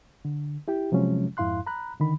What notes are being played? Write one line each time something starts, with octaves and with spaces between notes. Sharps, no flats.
D3
E4 G4 G5
C3 F3 F#3 G#3 C#4
F2 G#2 E4 F5 C6 F#6
A#5 B5 F#6
D3 D#3 B5